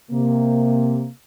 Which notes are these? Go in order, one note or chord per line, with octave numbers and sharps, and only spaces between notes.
C3 A#3